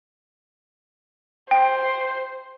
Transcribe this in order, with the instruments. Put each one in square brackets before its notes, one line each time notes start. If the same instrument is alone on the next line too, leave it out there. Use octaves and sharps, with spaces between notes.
[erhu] C5 [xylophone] G5